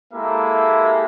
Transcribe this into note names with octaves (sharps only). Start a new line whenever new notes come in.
G#3 A#3 E4 G4 A4 E5